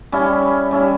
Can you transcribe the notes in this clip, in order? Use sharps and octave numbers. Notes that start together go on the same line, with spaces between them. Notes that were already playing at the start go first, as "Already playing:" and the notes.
G3 C#4 E4
G3 C#4 E4